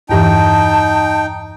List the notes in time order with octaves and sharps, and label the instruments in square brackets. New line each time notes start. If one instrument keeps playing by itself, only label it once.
[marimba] E2 G2 E3 [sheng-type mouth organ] D#4 G5 [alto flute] A5